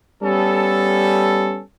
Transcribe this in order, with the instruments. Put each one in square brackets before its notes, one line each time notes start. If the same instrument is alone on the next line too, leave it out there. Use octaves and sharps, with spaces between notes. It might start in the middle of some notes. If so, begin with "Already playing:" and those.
[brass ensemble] G3 B3 C#4 A4